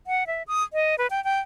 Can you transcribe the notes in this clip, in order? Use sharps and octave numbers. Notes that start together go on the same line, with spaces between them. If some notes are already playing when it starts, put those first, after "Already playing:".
F#5
E5
D#6
D#5
B4
G5
G5